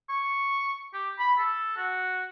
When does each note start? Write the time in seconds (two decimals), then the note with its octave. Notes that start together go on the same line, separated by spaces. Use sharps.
0.09 C#6
0.94 G4
1.19 B5
1.38 A4
1.77 F#4